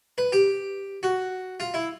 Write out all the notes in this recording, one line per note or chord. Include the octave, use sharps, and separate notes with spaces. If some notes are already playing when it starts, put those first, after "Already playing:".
B4
G4
F#4
F4
E4